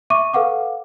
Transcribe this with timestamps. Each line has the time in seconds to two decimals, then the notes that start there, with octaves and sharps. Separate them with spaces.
0.10 E5 C#6 D6 D#7
0.34 A4 B4 F5 F#5 D6